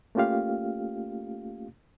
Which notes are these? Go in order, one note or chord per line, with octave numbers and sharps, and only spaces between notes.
A3 A#3 C#4 F4 G4 F5